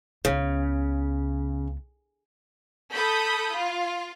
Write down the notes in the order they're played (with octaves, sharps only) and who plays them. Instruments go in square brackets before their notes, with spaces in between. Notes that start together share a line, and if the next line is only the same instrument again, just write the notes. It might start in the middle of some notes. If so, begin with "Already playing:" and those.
[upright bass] C#2 B3 [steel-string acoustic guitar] C#3
[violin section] A4 B5 D#6 G6
F4